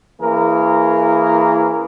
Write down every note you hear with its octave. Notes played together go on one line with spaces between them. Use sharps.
E3 A#3 C#4 G#4 A#4